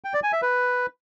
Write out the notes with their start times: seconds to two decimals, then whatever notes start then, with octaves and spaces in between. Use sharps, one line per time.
0.04 G5
0.14 D5
0.23 G#5
0.33 E5
0.42 B4